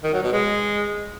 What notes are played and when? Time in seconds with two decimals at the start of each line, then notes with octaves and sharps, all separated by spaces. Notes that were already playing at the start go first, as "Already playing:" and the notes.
0.03 D#3
0.13 F#3
0.23 B2
0.33 G#3